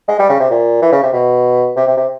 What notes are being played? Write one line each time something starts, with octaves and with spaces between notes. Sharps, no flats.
G#3
G3
C#3
C3
A#2
E3
C#3
C3
B2
C3
C3
C3